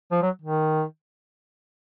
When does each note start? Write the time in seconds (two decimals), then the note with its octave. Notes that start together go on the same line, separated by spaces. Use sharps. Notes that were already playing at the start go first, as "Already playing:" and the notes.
0.11 F3
0.22 F#3
0.42 D#3